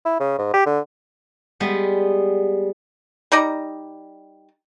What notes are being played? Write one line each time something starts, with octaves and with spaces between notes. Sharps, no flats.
E4
C#3
G#2
G4
D3
G3 G#3 B3
G3 D#4 D5 A#5